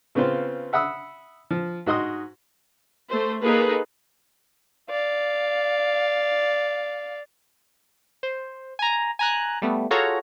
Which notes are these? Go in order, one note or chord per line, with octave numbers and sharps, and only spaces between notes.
C#3 B3 C4 F4 C5
E5 F#5 B5 D#6 E6
F3
G#2 F#4 D#5 C6 D#6
A3 C5
A#3 D#4 F4 G#4 A4 B4
D5 F5
C5
G#5 A#5
G#5 A#5 F#6
G3 A3 B3
F4 F#4 G#4 A4 C#5 A#5